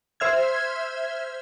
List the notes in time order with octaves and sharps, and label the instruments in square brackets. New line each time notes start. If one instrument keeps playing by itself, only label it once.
[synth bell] C5 E5 F6 G#6